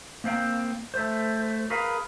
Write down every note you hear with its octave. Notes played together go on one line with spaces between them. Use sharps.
A#3 C4 F5 G5
A3 C5
G#4 A#4 B4 F5